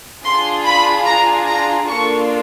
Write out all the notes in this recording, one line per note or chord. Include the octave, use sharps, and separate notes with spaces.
D4 F4 G#4 C6
B5
A#5
A#5
A#3 D4 F4 A4 C#6